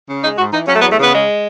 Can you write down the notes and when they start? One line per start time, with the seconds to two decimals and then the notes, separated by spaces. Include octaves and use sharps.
0.09 C#3
0.23 G#3 D#4
0.38 G#2 F#4
0.52 E3 D#4
0.68 F#3 C#4
0.75 A3
0.79 B3
0.82 E2
0.91 A3
0.98 C#3 B3
1.13 G#3